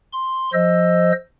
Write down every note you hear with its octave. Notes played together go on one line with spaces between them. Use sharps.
C6
F3 C5 D#5 E6